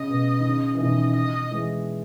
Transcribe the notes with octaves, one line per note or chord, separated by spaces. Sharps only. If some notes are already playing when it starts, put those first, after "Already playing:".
Already playing: C#3 D#5
B2
D#3
C#3
E3
B2 D#3 D#5
C#3
D#5
E3 G#3